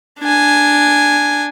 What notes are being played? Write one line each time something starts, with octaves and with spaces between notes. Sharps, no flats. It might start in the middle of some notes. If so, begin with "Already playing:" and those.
D4 G#5